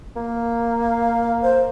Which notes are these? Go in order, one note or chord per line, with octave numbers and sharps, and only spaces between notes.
A#3
F5
C5